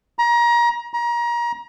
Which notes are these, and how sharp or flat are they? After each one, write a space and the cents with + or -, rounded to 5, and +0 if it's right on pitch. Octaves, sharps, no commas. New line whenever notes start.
A#5 +30
A#5 +30